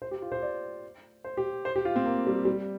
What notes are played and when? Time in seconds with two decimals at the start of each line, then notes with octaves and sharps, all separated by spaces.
0.02 C5
0.11 G4
0.22 F4
0.32 C5
0.42 D5
1.24 C5
1.37 G4
1.65 C5
1.76 G4
1.85 F4
1.96 C4
2.05 A#3
2.27 G3
2.45 G3